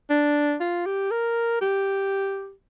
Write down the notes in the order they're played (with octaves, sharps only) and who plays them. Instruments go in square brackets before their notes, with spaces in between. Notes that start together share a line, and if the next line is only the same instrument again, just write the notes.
[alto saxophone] D4
F4
G4
A#4
G4